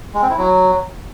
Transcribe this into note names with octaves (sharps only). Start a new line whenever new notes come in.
G#3
C4
E4
F#3